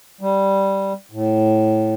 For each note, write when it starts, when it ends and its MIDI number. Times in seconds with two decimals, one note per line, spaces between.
0.21 0.93 55
1.12 1.94 45